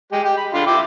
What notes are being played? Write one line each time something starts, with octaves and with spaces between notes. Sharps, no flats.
G#3 G4
G4
B5
D3 F4 C6
E4 G4 D6